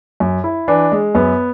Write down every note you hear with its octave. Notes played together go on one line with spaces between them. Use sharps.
F#2
E4
E3 D4
G#3
F#2 B3